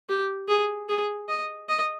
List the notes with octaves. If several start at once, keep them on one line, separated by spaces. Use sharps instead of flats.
G4
G#4
G#4
D#5
D#5